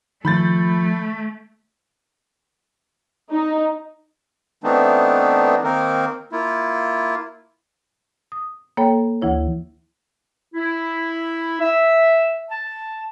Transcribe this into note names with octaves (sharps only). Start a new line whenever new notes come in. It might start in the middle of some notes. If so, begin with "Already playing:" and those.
D#3 F3 A3 B5 G6 A6
D#4
E3 A3 B3 C4 D4 D#4
D#3 A#3 C4 D#4 A#4
A#3 E4 F4
D#6
A#3 A4 C#5 G5 B5
D2 E3 E4 C#5
E4
E5
A5